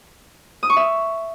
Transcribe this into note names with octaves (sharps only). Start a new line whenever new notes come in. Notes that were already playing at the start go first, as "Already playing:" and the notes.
D#6
C#6
E5